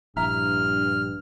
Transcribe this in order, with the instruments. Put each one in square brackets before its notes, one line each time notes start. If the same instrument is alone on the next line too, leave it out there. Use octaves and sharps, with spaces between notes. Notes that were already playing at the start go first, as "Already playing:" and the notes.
[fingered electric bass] A#1 [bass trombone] G2 [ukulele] E4 E5 A#5 [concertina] F6